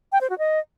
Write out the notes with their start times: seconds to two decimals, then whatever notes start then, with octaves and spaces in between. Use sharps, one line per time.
0.12 G5
0.21 C5
0.30 F#4
0.39 D#5